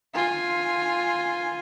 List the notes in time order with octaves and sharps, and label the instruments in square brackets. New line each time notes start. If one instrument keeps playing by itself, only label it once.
[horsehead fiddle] F4 G#5